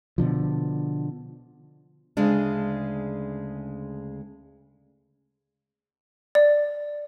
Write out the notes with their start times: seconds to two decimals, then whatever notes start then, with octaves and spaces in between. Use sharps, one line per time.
0.18 B2 D3 F3
2.17 D2 C#3 G#3 D4
6.35 D5